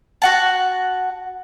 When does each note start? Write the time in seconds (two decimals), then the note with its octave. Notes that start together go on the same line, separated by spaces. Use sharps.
0.22 F#4 F#5 A5